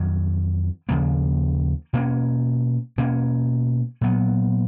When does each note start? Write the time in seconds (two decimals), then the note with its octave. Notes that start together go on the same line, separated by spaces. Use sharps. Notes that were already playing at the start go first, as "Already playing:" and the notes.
Already playing: F2 D#3 F#3
0.89 D#2 C#3 F3 A#3
1.93 B2 A#3 C#4
2.98 B2 A#3 C#4
4.01 A#2 F#3 B3